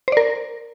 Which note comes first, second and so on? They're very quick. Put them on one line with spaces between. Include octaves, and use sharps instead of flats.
C5 D5 A#4